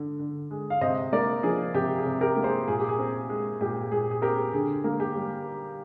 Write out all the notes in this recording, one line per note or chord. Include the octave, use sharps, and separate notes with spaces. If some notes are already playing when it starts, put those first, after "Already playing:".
Already playing: D3
D3
G#3
F5
C3 C5 D#5
A#3 A#4 D5
F3 G#4
C3 G4
G#4
C3
G4 A#4
A#3
G#4 C5
A#2 G#4
G4
G#4
C4
G#3
A#2 G4
A#2 G#4
G#4
C4 G4 A#4
D3 G#4
A#3
G4
G3